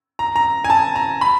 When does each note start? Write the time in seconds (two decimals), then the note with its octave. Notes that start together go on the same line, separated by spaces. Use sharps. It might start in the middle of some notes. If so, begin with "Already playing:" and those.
0.19 A#5
0.36 A#5
0.64 G#5
0.70 A5
0.96 A#5
1.21 B5